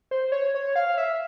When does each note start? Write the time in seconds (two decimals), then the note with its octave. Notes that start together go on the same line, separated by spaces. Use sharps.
0.11 C5
0.32 C#5
0.54 C#5
0.76 F5
0.98 E5